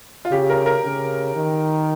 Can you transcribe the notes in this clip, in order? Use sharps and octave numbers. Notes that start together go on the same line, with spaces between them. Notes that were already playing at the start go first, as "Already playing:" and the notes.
F4
C#3 G4
A#4
A#4
C#3
D#3